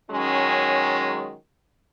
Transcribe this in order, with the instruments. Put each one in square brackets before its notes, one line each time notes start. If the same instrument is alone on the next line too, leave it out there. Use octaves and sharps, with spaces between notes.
[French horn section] D#3 F#3 G#3 C#4